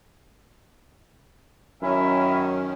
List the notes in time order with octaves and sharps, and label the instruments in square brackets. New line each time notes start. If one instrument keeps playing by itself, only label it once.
[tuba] F#2 [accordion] D#3 C#4 [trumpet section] E4 A#4 E5